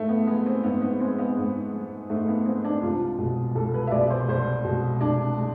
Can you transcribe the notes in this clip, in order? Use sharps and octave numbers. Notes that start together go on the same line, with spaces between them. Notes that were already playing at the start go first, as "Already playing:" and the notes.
Already playing: G#2 A3
B3
G#3 B3
C4
G#2 B3
B3
G#3 C4
B3
G#2
G#3
G#2 A3
B3
G#3 C4
D4
C2 F4
B2 G#3
C2 A4
B4
E5
B2 G#3 D5
C5
C2 C5
B2 G#3
C2 D4
G#3